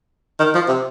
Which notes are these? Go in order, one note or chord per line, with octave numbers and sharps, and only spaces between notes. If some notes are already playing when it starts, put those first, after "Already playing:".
D#3
F3
C3